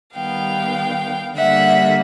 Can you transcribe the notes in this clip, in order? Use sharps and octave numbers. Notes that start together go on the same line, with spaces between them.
D#3 G3 B3 F5 G5
D3 G3 A#3 E5 F#5